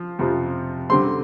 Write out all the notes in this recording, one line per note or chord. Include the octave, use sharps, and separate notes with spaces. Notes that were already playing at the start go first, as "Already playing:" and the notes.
Already playing: F3
F2 C3 F3
D3 G3 C4 C6